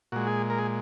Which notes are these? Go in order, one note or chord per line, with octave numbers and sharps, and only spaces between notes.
A#2 G#3 F#4
G#4
A#4
G#4